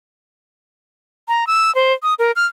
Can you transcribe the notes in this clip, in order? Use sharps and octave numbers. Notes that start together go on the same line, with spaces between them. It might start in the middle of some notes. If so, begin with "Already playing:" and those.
A#5
E6
C5
D#6
A#4
F6